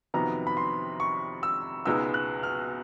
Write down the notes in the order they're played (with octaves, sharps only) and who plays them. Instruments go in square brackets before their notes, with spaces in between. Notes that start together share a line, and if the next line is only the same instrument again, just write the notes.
[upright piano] F2 C3 D#3 F#3 B3 [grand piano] A#5
[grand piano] B5
C6
C#6
E6
[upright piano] C#2 B2 G#3 B3 D#4 [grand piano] E6
[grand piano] F#6
F6